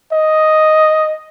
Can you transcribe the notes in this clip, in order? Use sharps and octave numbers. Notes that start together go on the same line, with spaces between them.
D#5